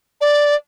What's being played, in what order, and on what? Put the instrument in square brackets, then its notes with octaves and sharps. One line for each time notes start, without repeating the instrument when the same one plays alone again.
[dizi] D5